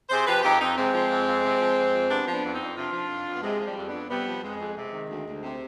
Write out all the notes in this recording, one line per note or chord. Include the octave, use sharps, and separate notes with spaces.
C3 G#4 C5
F3 G4 B4
F2 D#4 G4
F2 C4 D#4
C3 G#3 C4
F3
F2
F2
C3
F3
F2
F2
C3 B3 D4
F3
B3 D4
F2
C4 D#4
F2
C3 D4 F4
F3
F2
F2
B3
C3 G#3
F3
G3
F2
F2 B3 D4
C3 G3 B3
F3
F2 G#3
F2
C3 G#3
D#3
D2
D2
C3